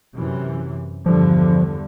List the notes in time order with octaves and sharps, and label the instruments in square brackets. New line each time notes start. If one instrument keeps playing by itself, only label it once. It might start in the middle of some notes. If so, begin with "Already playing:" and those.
[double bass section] F#2 C3 E3
[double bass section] E2 G2 D3 [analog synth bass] F3